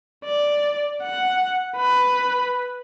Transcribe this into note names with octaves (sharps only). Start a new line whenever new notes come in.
D5
F#5
B4